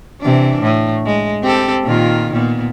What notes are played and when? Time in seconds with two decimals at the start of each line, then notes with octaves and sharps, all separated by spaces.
0.21 C3 E3 D4
0.62 A2
1.06 G#3
1.42 C4 G4 A4
1.84 A#2 D#3 F4
2.32 A#2 B3